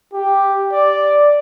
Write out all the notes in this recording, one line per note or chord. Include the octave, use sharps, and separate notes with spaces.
G4
D5